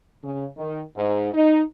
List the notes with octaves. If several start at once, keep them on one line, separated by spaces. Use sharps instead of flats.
C#3
D#3
G#2
D#4